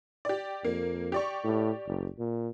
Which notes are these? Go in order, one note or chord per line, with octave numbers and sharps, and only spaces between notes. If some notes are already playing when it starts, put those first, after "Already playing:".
G4 D5
F2 A#3
G4 D5 C#6
A2
F#1
A#2